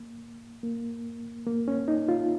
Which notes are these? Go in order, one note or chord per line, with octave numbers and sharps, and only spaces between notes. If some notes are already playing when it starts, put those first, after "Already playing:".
Already playing: A#3
A#3
A#3
C#4
D#4
F4